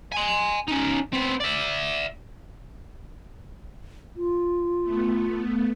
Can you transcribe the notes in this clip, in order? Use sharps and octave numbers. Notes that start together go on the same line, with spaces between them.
G#5 C6
C#4 D#4
B3 C4
D5 E5
F4
A3 B3